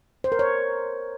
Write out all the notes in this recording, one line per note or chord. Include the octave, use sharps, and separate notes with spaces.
C5
A#4
C#5